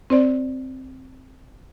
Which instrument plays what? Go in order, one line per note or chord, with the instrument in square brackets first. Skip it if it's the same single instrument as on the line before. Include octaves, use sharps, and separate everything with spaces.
[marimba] C4 C5 D5